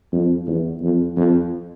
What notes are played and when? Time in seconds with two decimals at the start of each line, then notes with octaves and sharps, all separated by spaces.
0.13 F2
0.47 E2
0.82 F2
1.16 F2